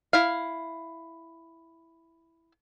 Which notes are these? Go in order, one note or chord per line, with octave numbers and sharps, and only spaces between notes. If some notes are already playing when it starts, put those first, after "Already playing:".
E4 F5